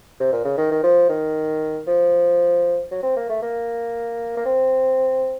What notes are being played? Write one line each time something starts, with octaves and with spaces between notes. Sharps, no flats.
C3
A#2
C#3
D#3
D#3
F3
D#3
F3
F#3
C4
A#3
A3
A#3
A#3
C4